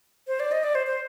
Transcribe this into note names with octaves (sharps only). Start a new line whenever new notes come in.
C5
D5
D#5
D5
C5
C5